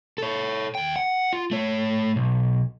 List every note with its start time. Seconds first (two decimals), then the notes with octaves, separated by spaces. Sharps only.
0.18 A4 C#5
0.75 D#2 G5
0.96 F#5
1.33 F4
1.51 A3 C#5
2.16 B1